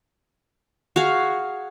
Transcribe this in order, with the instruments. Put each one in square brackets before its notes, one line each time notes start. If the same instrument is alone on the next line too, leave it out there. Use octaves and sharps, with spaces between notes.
[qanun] F#4 G#4 F5